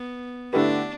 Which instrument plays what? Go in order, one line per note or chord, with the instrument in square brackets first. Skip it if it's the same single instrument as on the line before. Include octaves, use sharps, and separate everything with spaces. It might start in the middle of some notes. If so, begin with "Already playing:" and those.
Already playing: [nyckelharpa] B3
[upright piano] D3 A3 E4 G4 B4 [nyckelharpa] D4